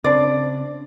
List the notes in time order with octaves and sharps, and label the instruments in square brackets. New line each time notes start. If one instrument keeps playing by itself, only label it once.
[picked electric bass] C#3 C4 D4 [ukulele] D5